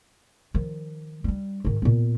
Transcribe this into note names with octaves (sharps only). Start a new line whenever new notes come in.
D#3 F3
G3 D4
G#2 D#3
A#2 B3